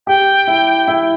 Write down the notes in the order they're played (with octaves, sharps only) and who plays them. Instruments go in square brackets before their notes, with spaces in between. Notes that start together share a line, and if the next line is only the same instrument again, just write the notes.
[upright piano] G4 [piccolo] G5
[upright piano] E4
E4